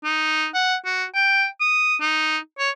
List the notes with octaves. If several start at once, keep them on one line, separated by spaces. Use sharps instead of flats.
D#4
F#5
F#4
G5
D#6
D#4
C#5